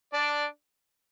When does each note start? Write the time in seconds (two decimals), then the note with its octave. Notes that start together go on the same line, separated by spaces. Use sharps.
0.13 D4 D5